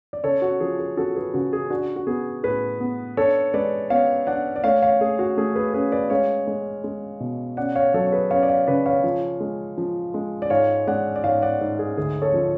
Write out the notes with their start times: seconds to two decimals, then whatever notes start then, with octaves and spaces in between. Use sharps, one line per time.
0.13 D5
0.23 C#3 A4 C#5
0.42 F#4
0.60 F3 G#4
0.79 G#4
0.97 F3 F#4 A4
1.16 G#4 B4
1.34 C#3 F#4
1.53 G#4
1.70 D4 F#4
1.96 F#4
2.07 B3 G#4
2.44 A2 G#4 B4
2.80 B3
3.17 D4 A4 C#5
3.54 G#3 B4 D5
3.90 B3 C#5 F5
4.27 D4 D5 F#5
4.56 D5
4.64 A3 C#5 F5
4.82 C#5 F5
5.01 A3 G#4
5.19 F#4
5.37 A3 G#4
5.56 G#4 B4
5.74 C#4 G#4 B4
5.92 B4 D5
6.10 G#3 C#5 F5
6.47 G#3
6.84 G#3
7.20 B2
7.57 C#4 D5 F#5
7.76 C#5 F5
7.94 F#3 A4 C#5
8.06 C#5
8.12 G#4 B4
8.31 C#4 C#5 F5
8.43 D5
8.49 C#5 F5
8.67 C#3 B4 D5
8.86 C#5 F5
9.04 F3
9.40 G#3
9.78 F3
10.14 G#3
10.42 D5
10.50 G#2 C#5 F5
10.87 G#3 D5 F#5
11.16 D5
11.24 G#2 C#5 F5
11.42 D5 F#5
11.61 G#2
11.79 G#4
11.97 D2 G#4
12.22 A4 C#5
12.34 F3